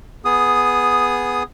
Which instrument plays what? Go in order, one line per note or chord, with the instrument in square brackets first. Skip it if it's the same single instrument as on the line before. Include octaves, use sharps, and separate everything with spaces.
[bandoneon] B3 G#4 D#6